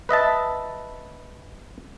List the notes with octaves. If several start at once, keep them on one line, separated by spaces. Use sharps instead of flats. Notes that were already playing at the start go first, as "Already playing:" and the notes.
B4 D#5 E5 A5